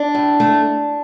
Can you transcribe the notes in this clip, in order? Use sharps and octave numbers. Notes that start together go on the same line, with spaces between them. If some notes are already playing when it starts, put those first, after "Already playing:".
Already playing: D4
A2
A3